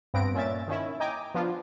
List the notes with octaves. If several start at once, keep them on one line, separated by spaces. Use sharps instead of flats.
G2 B3 C4 A#6 D7
A#2 C#4 E5 A6
D#3 C#4 E4
D#5 G5 G#5 A#5 D6
F3 B3 D4 F4